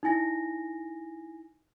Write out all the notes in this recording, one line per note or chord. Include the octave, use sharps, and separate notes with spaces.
D#4 E4 G#5 A#6